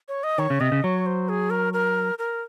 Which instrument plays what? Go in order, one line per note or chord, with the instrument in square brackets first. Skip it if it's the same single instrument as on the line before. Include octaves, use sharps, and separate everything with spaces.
[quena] C#5
D#5
[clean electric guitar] D#3 [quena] C#5
[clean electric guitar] C#3
[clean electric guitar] C3 [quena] D#5
[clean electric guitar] C#3
[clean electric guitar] F#3 [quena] C#5
[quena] C5
G#4
A#4
A#4
A#4